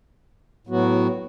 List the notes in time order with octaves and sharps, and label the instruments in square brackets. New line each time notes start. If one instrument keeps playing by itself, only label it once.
[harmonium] A2 F#3 B3 F#4